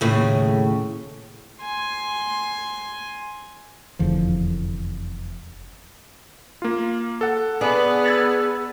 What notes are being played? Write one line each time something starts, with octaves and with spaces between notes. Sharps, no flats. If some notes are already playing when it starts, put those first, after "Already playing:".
D#2 A2 C#3
G#5 C6
F1 E2 D3 F3
A#3 F4
A4 F#5
B3 D4 G#4 B4
E6 G#6 A6